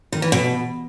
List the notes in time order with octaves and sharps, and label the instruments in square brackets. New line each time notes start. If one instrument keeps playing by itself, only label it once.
[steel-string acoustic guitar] D#3
E3
B2